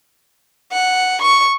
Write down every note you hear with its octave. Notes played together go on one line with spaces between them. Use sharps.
F#5
C#6